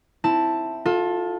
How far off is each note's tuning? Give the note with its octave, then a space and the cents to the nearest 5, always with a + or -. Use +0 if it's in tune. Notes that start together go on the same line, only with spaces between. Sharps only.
C4 +0 E4 +0 A5 +0
F4 +30 A4 +0